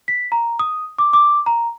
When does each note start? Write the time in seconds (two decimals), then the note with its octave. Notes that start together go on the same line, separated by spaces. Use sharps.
0.08 B6
0.32 A#5
0.59 D#6
0.98 D6
1.13 D6
1.46 A#5